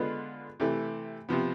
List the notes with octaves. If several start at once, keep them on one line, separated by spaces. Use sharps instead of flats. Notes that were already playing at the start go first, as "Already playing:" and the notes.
Already playing: D3 G#3 B3 F4 B4
C3 E3 A3
C3 F3 B3